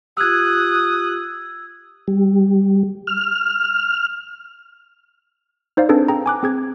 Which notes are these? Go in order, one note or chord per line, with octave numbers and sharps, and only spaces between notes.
F4 G4 D#6 E6 F#6 G#6
G3
F6
D#4 C5 D5 F5
C4 D4 G#4 A4 B4
G#4 G5 A#5
G#5 D6 F#6
C4 G#4 G#6